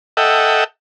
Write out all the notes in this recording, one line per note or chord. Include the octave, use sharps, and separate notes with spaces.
A4 D#5 E5 F#5 G5